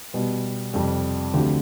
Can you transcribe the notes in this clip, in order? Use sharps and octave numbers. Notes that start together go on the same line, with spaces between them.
B2 G3 B3
F2 C3 G3
D2 D3 F3 C4 G4